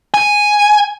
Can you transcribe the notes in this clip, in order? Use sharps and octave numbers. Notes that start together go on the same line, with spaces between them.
G#5